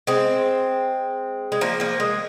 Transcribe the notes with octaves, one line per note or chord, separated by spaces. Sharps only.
G#3 C4
G#3
F3 A#3
F3 A#3
G#3